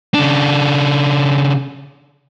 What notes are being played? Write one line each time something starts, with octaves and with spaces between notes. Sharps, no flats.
C#3 D4